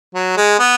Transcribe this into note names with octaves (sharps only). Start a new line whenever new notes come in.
F#3
G#3
B3